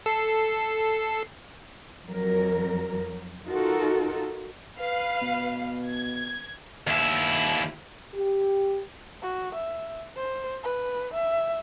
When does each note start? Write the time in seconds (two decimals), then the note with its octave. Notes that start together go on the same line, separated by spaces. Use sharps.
0.06 A4 C7
2.05 F2 F#3 A#4
3.45 D#4 F4 F#4 A4 A#4
4.78 B4 F5
5.22 B2
5.86 G#6
6.87 D#2 E4
8.14 G4
9.22 F#4
9.54 E5
10.17 C5
10.64 B4
11.13 E5